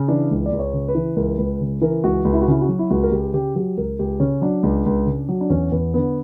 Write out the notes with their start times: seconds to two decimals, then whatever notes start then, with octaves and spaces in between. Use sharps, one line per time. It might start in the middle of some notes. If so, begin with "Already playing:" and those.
Already playing: C#3
0.08 E3 D4
0.31 C#2
0.46 D5
0.52 C#2
0.59 C#5
0.73 C#3
0.88 B4
0.95 E3
1.16 C#2 A#4
1.38 C#2 B4
1.60 C#3
1.81 E3 A#4
2.04 C#2 F#4
2.25 C#2
2.33 E4
2.41 F#4
2.48 C#3 E4
2.61 F#4
2.69 F#3
2.79 E4
2.90 C#2 F#4
3.03 A#4
3.11 C#2 G4
3.33 C#3 G4
3.55 F#3 G4
3.77 C#2 A#4
3.99 C#2 G4
4.20 C#3 C#4
4.41 F#3 D4
4.63 C#2
4.86 C#2
5.06 C#3
5.29 F#3
5.41 D4
5.50 E2 C#4
5.72 E2 B3
5.94 D3 B3